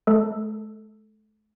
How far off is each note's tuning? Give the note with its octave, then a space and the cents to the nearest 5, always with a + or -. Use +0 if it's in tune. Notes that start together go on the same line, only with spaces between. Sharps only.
A3 -45 A4 +5